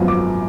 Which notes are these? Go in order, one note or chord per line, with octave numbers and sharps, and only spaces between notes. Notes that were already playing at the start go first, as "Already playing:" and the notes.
Already playing: G#1 F#2 F3 B3 F4
D6